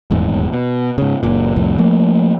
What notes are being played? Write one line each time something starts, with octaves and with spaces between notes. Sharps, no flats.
D#1 E2 G#2
B2
G#2 C#3
F#1 A#2
C2 F2 A2
F3 A3 A#3